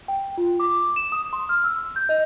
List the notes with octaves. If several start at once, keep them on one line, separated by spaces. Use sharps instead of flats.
G5
F4
D6
E7
D#6
C6
F6
E6
G6
D#5